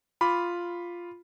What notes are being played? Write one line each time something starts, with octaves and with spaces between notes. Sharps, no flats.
F4 B5 D6